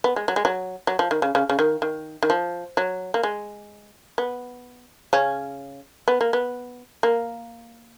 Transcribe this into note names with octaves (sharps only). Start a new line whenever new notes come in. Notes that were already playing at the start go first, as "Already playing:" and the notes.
B3
G#3
F#3
G#3
F#3
F#3
F3
D#3
C#3
C#3
C#3
D#3
D#3
D#3
F3
F#3
A#3
G#3
B3
C#3 C#4
B3
A#3
B3
A#3